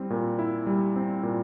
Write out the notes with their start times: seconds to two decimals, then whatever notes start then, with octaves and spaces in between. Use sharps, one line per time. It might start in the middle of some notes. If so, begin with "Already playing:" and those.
Already playing: G3 C4 E4
0.10 A#2
0.39 E4
0.67 G3
0.96 C4
1.23 A#2